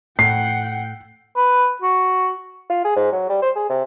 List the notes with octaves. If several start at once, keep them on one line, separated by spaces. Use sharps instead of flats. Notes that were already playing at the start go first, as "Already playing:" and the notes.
A2 F#5 G5 C7
B4
F#4
F4
G#4
G#2
F#3
G3
C5
G#4
C3